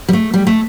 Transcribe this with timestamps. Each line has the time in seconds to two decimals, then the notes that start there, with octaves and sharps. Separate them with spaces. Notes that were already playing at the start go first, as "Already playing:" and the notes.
0.08 G3
0.13 A3
0.34 G3
0.47 A3